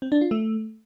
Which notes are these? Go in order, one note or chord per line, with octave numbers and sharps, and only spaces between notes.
C4
D4
F4
A3